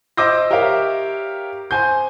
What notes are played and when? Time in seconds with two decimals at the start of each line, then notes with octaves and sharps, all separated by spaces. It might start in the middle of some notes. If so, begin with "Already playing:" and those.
0.17 C5 D#5 D6 E6 G6 A#6
0.50 G4 A#4 C#5 E5 F5
1.71 C5 G#5 G6